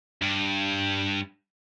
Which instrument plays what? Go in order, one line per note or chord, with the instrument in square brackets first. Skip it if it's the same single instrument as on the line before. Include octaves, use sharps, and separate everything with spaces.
[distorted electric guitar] G2